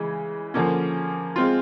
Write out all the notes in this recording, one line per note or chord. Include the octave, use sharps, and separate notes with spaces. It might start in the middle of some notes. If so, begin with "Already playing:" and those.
Already playing: C#3 E3 G#3
D3 F3 A#3 C#4
G#3 C4 F4